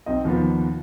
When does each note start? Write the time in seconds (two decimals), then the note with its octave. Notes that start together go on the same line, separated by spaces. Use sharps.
0.06 B1 C4 D#5
0.25 D#2 B2 D#3 F3 B3